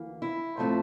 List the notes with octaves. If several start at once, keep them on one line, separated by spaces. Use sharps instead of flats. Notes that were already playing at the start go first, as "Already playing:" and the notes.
Already playing: D2 E3 A#3
E4
A2 F3 A3 C4